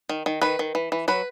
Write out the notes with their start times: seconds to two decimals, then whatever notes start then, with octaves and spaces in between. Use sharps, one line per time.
0.09 D#3
0.26 D#3
0.42 D#3 B4
0.59 D#3
0.75 E3
0.92 E3
1.08 F#3 B4